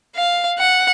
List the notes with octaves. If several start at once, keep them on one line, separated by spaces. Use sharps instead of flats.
F5
F#5